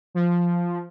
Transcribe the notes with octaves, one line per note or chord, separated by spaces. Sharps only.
F3